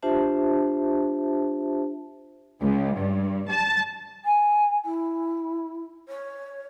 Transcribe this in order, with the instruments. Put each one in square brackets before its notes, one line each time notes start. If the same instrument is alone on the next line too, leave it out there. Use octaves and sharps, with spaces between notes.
[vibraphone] D4 F4 G4 C5 E5 A5
[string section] C#2
G2
A5
[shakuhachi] G#5
E4
C#5